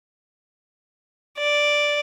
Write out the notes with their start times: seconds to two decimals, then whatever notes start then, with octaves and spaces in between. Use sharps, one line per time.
1.38 D5